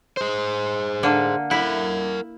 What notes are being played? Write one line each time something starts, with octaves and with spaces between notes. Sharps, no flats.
G#4 C5
D3 A#3
E4 A#4 F#5